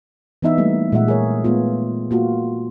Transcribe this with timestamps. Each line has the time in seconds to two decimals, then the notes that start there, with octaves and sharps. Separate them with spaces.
0.42 E3 B3 D#4 E5
0.58 G3 A3 A#3
0.92 A#2 G#3 A3 E5 F#5
1.08 G#4 A#4 C#5
1.44 G#3 A3 B3 F4
2.11 A#3 F4 F#4